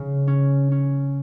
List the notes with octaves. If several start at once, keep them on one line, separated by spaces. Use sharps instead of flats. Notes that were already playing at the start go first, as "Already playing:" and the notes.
Already playing: C#3
C#4
C#4